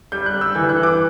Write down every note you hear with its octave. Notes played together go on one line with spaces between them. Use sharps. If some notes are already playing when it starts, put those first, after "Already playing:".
G3 G6
F#6
G3
E6
E3 G6
F#6
E3
D6